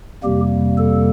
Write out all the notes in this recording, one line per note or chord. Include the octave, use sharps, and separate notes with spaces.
F2 C3 G3 A#3 G4
A4